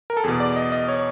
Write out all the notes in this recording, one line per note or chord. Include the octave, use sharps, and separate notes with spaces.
A#4
A4
E2 B2 G#4
D5
D#5
D#5
C#5